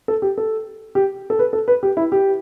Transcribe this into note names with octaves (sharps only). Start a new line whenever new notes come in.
A4
G4
A4
G4
A4
B4
A4
B4
G4
E4
G4